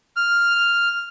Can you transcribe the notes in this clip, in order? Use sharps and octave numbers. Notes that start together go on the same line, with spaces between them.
F6